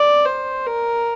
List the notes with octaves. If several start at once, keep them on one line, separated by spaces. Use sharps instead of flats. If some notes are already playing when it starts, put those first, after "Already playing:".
Already playing: D5
C5
A#4